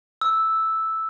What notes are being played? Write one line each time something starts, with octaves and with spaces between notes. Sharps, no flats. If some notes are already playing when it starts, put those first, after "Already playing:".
E6